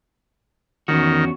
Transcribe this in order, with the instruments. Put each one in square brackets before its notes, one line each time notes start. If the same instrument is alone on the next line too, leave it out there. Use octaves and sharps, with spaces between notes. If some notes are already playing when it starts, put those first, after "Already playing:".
[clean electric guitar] E2 C#4 F#4 [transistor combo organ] D#3